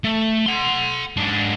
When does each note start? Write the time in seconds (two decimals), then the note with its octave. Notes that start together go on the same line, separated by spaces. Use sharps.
0.04 A3
0.46 F#5 C6
1.17 G#2 D4